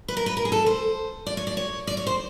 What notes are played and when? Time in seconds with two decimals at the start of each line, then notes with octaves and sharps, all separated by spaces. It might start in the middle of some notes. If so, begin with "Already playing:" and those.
0.08 B4
0.17 A#4
0.26 B4
0.37 A#4
0.45 G#4
0.52 A4
0.66 C5
1.27 D5
1.37 C#5
1.47 D5
1.57 C#5
1.87 D5
1.97 C#5
2.07 C5